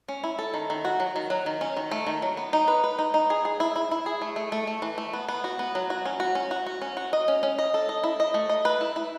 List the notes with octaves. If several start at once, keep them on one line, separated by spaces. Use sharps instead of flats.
C#4
E4
A4
D#3
D#3
F#4
F#3
D#3
F#3
D#3
C#4
D#3
A3
D#3
F#3
B3
D#4
B4
B4
D#4
D#4
G#4
G#4
E4
E4
E4
G#4
A3
A3
A3
A3
E3
A3
B3
B3
F#4
B3
F#3
F#4
C#4
F#4
C#4
F#4
F#4
C#4
F#4
D#5
C#4
C#4
D#5
A4
D#5
E4
D#5
A3
D#5
B4
E4
E4